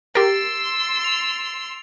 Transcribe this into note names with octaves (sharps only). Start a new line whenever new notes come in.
G4 A#4 C6 E6 A6 D7
F7